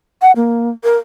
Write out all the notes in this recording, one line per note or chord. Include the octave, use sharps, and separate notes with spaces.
F#5
A#3
A#4